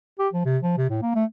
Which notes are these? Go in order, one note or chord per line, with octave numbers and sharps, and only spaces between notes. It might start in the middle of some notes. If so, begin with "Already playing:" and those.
G4
F3
C3
F3
C3
A2
A#3
A3